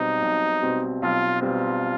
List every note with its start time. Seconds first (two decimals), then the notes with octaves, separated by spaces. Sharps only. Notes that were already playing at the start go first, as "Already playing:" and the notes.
Already playing: B1 B2 G3 C4 D#4
0.22 B1
0.62 B2 G3 C4
1.02 B1 F4
1.42 B2 G3 C4 F4